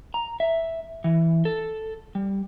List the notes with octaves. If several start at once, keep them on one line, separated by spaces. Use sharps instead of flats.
A#5
E5
E3
A4
G3